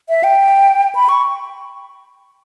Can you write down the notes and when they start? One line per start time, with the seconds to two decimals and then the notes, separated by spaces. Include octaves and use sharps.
0.09 E5
0.24 G5
0.95 B5
1.09 C#6